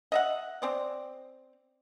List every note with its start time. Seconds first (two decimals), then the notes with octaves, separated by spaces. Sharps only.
0.12 D#5 E5 F#5
0.62 C4 C5 D5